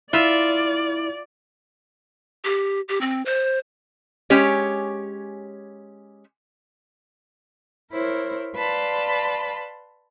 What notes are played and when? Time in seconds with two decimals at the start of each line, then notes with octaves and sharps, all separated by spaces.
0.13 E4 F4 D5 E5
2.45 G4
2.89 G4
3.01 C4
3.26 C5
4.30 G#3 C#4 G4 C#5
7.91 E4 A#4 C5 C#5
8.55 B4 D5 F5 A5 B5 C6